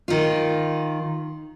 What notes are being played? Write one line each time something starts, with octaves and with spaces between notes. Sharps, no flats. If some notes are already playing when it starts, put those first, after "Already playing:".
D#3 F4